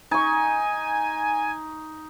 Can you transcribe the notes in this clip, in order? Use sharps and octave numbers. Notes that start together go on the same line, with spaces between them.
D#4 G#5 C#6